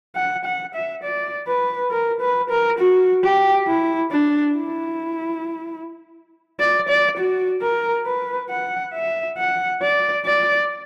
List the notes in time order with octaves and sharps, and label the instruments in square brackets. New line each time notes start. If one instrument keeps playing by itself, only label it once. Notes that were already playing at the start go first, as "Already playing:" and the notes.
[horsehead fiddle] F#5
F#5
E5
D5
B4
A#4
B4
A#4
F#4
G4
E4
D4
E4
D5
D5
F#4
A#4
B4
F#5
E5
F#5
D5
D5